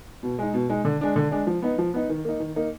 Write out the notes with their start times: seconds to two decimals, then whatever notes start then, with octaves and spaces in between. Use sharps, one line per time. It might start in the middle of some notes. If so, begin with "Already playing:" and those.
0.23 B2
0.39 G#3 D#4
0.54 B2
0.69 G#3 D#4
0.85 D3
1.01 G#3 D4
1.16 D3
1.31 G#3 D4
1.47 F3
1.62 B3 D#4
1.78 F3
1.94 B3 D#4
2.09 D#3
2.25 A#3 D#4
2.40 D#3
2.56 A#3 D#4